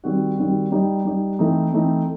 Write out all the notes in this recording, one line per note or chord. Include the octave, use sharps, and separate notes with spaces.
D#3 G3 C4 F#4
D#3 G3 C4 F#4
G3 D#4 G4
G3 D#4 G4
E3 A3 C4 D#4
E3 A3 C4 D#4